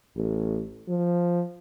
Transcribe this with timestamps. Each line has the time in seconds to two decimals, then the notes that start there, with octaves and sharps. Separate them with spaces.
0.16 A1
0.89 F3